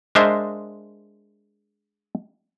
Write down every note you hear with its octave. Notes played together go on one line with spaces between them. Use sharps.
G#3 D4 A#4 C5 D#5 E5